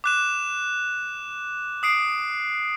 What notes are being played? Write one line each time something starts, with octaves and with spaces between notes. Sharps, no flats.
D6 F#6 E7
D#6 C7 D7